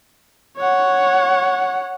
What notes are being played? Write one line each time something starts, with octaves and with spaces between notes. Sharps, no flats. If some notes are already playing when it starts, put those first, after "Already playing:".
C#5 F#5